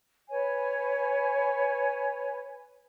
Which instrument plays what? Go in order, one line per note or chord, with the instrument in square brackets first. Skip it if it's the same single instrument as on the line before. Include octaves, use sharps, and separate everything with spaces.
[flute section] B4 C#5 G#5